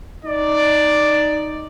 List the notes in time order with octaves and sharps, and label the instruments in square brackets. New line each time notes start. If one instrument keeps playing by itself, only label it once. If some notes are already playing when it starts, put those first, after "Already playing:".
[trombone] D#4 [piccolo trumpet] D5